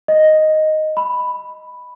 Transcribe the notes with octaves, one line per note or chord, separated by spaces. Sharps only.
D#5
B5